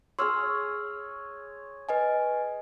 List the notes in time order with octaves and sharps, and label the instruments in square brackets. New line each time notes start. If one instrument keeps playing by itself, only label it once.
[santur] G#4 C#5 [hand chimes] C6 E6 F6
[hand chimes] B4 D#5 G#5